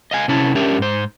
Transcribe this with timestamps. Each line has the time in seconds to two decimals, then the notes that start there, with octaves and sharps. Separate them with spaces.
0.11 D#5 F5 G#5
0.28 C3 C#4 E4 C#5 A5
0.55 C#4 D4 G4 A#4 C#5 E5
0.78 G#2 C5